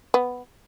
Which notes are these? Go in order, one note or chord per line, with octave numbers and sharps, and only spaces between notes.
B3